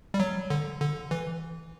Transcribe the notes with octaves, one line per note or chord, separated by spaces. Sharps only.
G3
F#3
D3
D3
E3